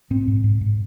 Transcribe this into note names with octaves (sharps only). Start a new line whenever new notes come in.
G#2 C4
G#2
G#2
G#2